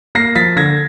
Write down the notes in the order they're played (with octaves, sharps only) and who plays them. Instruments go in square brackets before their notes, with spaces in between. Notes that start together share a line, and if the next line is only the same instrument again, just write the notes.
[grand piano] A#3 A#6 C7
F3 A6 B6
D3 G#6 A#6